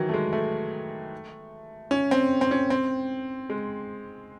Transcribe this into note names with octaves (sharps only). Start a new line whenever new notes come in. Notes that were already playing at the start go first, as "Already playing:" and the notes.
Already playing: D#3 E3 F#3
A3
G#3
A3
C#4
C4
C4
C#4
C4
G#3